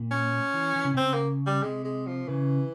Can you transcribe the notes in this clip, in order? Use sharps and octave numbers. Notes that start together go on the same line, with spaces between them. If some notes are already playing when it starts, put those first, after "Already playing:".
Already playing: A#2
C#4
E3
E3
C#3
C3 C4
C#3
A#3
G3
C3 G#3
G#3
F3
C#3 E3